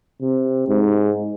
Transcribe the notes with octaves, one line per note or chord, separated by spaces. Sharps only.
C3
G#2